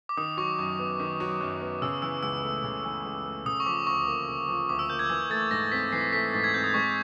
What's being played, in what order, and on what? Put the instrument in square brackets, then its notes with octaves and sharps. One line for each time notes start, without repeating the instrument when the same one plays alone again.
[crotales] D6
[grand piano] D#3 [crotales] D#6
[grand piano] F#3 [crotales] C#6
[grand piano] F#2
B3
[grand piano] D#3 [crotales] D6
[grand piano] F#3
F#2
B3
[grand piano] C#3 [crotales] E6
[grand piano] E3 [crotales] E6
[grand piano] C#2 [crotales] E6
[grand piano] A3
C#3
E3
C#2
A3
[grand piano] C#3 [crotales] D#6
[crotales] C#6
[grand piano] F3 [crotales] D6
[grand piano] D2 [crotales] C#6
[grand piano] A#3
C#3
F3
[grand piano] D2 [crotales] D6
[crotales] E6
[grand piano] A#3 [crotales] G6
[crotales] G#6
[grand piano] E3 [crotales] G#6
[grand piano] A3 [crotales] A6
[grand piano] G#2 [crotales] A#6
[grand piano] C4 [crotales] B6
[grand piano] E3 [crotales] C7
[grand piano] A3 [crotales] B6
[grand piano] G#2 [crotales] A6
[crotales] G#6
[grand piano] C4 [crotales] G6
[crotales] D#6
[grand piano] G#3 [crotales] C#6